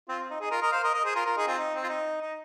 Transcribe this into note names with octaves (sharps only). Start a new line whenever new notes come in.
C4 F4
C4
D#4
D#4 G#4
F4 A#4
A#4 D#5
C5 F5
A#4 D#5
A#4 D#5
G#4 C5
F4 A#4
F4 A#4
D#4 G#4
C4 F4
D#4
C4
F4
D#4
D#4